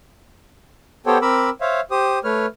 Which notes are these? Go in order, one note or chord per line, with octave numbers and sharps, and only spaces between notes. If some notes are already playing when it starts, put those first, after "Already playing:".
B3 G4 A4 C5 C#5 G5
C4 A#4 B5 D6 E6
C5 C#5 E5 F5
G4 C5 D#6
A3 B4 C#5 F6